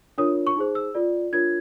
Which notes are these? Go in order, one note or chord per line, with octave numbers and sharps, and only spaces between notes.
D4 F4 A#4 C#5 D#6
C#6
D#4 G#4 C5
E6
F4 A4 D5
D4 F4 A#4 C#5 G#6